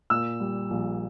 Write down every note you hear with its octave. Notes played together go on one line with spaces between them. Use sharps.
A#2 E6
G3
A#1